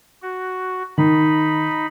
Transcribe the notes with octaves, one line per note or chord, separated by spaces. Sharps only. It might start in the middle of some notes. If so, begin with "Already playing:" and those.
F#4
D#3 D#4 B5